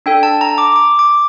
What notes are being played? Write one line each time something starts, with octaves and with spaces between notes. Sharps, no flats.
D4 A4 G5
A5
A#5
D6
D6
D6